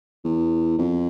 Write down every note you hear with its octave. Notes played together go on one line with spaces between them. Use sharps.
E2
F2